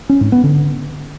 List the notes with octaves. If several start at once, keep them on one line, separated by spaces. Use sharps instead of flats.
C#4
G#2
B3
D3